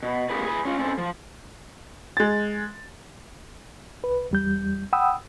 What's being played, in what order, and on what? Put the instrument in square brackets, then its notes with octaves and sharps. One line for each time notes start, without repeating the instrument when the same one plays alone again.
[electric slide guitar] B2
A#3 C4 G4 G#4 B4
G#4 B4
C#4 F4
C4 C#4 A4
F3
[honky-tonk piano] G#3 A6
[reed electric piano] C2 B4
E2 G3 G6
F#5 G5 B5 D#6 E6